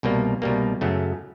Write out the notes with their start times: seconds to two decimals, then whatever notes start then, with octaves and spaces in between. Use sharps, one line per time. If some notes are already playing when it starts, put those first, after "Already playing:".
0.03 C2 B2 G3 A#3
0.42 C2 B2 G3 A#3
0.81 F#2 C#3 F#3 A3